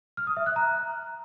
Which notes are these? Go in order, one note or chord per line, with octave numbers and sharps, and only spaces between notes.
F6
D#6
E5
F#6
A#5